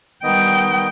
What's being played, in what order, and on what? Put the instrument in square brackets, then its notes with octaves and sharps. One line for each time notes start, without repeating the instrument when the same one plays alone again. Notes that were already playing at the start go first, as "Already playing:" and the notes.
[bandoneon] D#3 B3 D#5 [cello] G3 G5